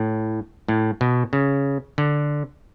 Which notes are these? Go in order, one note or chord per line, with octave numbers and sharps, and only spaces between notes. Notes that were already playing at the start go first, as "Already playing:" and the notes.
Already playing: A2
A2
B2
C#3
D3